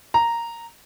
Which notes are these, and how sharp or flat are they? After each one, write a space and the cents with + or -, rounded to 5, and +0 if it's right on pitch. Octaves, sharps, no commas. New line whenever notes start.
A#5 -5